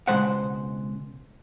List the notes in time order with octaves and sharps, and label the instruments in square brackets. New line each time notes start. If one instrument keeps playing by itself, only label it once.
[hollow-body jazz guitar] C#2 B2 G#3 C5 F#5